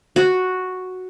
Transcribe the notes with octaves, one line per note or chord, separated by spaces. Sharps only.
F#4